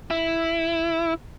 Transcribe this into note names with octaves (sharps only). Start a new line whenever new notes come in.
E4